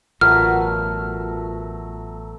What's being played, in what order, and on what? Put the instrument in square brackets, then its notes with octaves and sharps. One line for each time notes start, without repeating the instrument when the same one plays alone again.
[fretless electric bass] A1 [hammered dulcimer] B2 F#3 A3 [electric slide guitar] F4 A#4 B4 [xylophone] F6